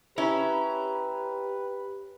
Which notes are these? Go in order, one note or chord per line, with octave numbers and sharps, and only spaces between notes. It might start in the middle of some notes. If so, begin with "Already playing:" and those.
C#4 E4 G4 B4 A#5